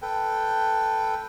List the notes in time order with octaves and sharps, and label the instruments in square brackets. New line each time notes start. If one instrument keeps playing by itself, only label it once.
[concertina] A4 B4 G5